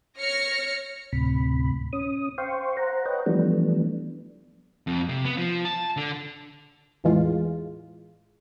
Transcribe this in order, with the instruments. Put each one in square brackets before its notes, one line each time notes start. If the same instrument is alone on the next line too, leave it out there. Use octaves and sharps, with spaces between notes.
[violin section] C#5 F6 A#6 C#7
[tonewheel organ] D2 A2 C3 B5
C#4 D#6
C5 F5 G5 C6 C#6
C5 F#5 A#5
B4 C#5 D#5 F#5 G5
E3 F3 G3 A3 B3 D4
[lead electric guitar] F2
C3
B3
F3
A5
D3
[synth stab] E2 A2 E3 G#3 F4